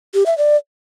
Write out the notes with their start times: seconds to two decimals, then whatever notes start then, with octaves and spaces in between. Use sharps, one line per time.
0.14 G4
0.26 E5
0.38 D5